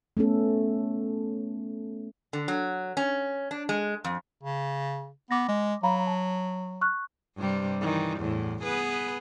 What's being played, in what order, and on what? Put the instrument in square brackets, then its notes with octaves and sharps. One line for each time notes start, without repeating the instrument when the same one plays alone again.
[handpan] A3 B3 C#4 A4
[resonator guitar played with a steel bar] D3
F#3
C#4
D4
G#3
F2
[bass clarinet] C#3
[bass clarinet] B3 [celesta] D6 A#6
[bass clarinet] G#3
[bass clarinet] F#3 [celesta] F5 A#5 B5
[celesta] A5
C#6 F6 F#6
[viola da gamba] G2 C3 G3
D#3 E3 G3
E2 A2
B3 G#4 B4